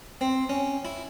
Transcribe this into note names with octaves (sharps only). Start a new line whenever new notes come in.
C4
C#4
E4